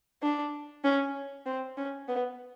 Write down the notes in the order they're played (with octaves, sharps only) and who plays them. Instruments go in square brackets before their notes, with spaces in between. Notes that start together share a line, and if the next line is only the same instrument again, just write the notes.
[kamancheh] D4
C#4
C4
C#4
B3